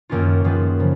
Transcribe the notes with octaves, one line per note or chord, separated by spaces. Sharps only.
F#2 D#3 A#3 C#4 F4
F#2 D#3 G#3 B3 F4
C#3 F3